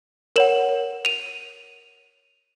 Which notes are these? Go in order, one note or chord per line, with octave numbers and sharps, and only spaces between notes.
A#4 C#5 F#5 E7 F#7
D#7 F7